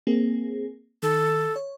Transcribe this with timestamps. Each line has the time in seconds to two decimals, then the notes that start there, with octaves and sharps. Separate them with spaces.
0.07 A#3 C4 G#4
1.03 D#3 A4
1.56 C#5